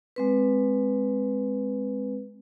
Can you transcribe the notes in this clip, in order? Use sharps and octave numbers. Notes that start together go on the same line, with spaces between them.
G#3 C4 B4